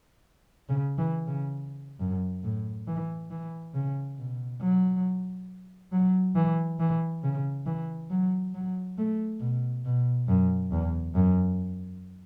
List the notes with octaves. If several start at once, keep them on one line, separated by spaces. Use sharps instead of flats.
C#3
E3
C#3
F#2
A2
E3
E3
C#3
B2
F#3
F#3
E3
E3
C#3
E3
F#3
F#3
A3
B2
B2
F#2
E2
F#2